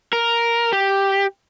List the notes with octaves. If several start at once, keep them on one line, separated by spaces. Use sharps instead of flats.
A#4
G4